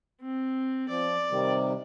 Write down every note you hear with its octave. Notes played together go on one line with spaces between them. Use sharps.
C4
F3 D5
C3 D#3 G3